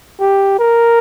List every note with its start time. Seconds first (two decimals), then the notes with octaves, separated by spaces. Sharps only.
0.20 G4
0.59 A#4